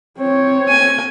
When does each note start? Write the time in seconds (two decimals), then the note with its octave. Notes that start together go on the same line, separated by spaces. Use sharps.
0.18 C4 C#5
0.69 G#5